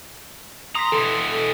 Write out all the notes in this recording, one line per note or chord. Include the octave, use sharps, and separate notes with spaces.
A#5 C6 D#6 B6
B2 E3 A4